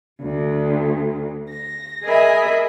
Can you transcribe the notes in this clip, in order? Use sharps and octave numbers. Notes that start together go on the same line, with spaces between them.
D2
A#6
G#4 A#4 D#5 E5 G#5 B5